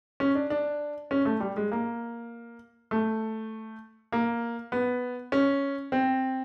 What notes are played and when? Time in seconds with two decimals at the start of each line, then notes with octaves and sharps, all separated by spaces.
0.20 C#4
0.35 D4
0.50 D4
1.11 C#4
1.25 A3
1.40 G3
1.57 G#3
1.72 A#3
2.91 A3
4.12 A#3
4.72 B3
5.32 C#4
5.92 C4